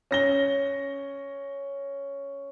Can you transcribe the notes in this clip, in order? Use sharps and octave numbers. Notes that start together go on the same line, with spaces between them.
C#4 A#6 G7